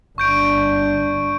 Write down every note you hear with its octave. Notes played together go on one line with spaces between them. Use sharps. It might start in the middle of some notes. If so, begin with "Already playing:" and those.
G1 D4 C#6 G6 D7